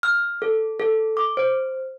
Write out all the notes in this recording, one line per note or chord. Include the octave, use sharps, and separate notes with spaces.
F6
A4
A4
D6
C5